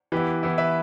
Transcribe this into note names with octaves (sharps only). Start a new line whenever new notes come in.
E3 B3 E4 G4 B4
E3 B3 E4
B4 E5